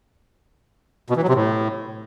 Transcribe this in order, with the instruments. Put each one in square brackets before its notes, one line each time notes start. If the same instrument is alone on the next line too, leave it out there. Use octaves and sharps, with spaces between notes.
[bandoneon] B2
E3
F#3
C3
A2